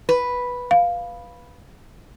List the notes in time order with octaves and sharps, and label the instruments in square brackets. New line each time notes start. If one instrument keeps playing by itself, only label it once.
[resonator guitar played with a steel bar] B4
[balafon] F5